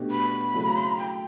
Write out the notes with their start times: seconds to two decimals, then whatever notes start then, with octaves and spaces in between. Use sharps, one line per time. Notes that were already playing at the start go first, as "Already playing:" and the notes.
Already playing: B2 A3 D4 G4
0.11 B5
0.54 C#3 F#3 A3 E4 A4
0.98 G5